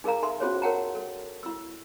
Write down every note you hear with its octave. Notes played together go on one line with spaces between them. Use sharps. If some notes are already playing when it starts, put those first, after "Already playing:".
D#4 G#4 A#4 F5 A#5
D#4 A4 E5 C6
C#4 F4 F#4 G#4 C5 C#5
A#4 C#5 F#5 G5 A5 A#5
A4
E4 E6